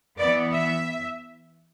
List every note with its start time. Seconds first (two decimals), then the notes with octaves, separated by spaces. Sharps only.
0.18 E3 B3 D5
0.52 E5